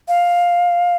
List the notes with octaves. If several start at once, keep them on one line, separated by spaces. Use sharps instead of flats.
F5